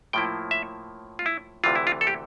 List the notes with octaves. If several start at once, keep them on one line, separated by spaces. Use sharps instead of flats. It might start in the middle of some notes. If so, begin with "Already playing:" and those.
A2 F3 A#3 E4 G5
E5
F4
E4
D2 C3 E3 F4
E4
F4
A4
G4